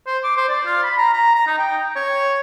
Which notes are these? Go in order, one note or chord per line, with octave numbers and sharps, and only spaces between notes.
C5
D6
C5
D5
F4
B5
A#5
A#5
A#5
D#4
G5
C#5